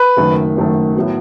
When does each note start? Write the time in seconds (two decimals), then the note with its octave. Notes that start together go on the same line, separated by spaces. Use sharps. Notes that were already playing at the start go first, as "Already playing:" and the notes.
Already playing: B4
0.17 F#1 F#2 D#3 A3
0.56 F#1 F#2 D#3 A3
0.96 A2 F#3 B3 F#4